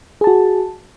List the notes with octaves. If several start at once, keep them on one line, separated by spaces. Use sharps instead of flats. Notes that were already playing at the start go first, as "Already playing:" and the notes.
F#4 G#4 A5